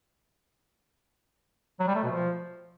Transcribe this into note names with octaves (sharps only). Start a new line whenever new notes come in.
F#3
G3
A3
B2
F3